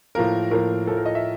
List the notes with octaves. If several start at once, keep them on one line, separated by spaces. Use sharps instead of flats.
A2 F3 A#3 A#4
A2 F3 A#3 A#4
A2 F3 A#3 A4
A#4
D#5
E5